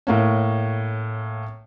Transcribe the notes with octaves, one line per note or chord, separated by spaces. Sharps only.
A2 A#3 C#4